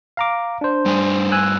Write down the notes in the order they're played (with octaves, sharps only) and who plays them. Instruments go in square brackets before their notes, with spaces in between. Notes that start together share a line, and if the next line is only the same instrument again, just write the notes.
[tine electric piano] F5 A#5 D6
D4 C5
[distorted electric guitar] G2 G#4
[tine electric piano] G#5 E6 F#6